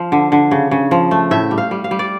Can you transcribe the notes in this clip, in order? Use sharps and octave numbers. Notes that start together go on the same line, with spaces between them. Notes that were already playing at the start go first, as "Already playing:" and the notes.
Already playing: F3 F5
D3
D3
C#3
C#3
F3
A3
A2 E5
G3
F5
G3
F5
G3
D5